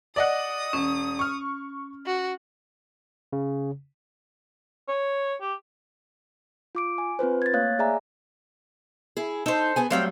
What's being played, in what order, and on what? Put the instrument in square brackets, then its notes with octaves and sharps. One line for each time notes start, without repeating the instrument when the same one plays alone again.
[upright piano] D5 D#5 F#5 [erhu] D#6
[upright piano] E1 [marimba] C#4
[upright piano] C#6 F6
[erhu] F#4
[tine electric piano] C#3
[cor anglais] C#5
G4
[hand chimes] F4 D6 D7
G#5
C4 F4 B4 C5
G#6 A6
A3 A#3 C#5 F5 F#6
G#4 D5 E5 G#5 A#5
[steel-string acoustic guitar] E4 G#4
[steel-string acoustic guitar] D#4 [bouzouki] A4 C5
[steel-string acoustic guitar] B3 G#4 G#5
[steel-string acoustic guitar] F#3 G3 A3 [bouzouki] C4 F5 G5